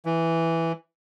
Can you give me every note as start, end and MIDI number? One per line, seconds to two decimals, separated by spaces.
0.05 0.72 52